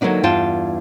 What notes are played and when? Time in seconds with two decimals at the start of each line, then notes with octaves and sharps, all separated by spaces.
0.01 D3 F#3 A#3 B3 D4 D#4
0.23 E2 G2 F4 G5 A5